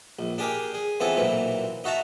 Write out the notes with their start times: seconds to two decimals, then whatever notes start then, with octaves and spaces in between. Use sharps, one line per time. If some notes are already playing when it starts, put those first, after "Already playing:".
0.19 A#1
0.38 D4 G4 G#4 A#4 G5
0.74 G#4
1.00 E3 B3 C4 F4 G#4 A4
1.17 B1 A#2 E3 C4
1.84 D#4 F#4 E5 A5 A#5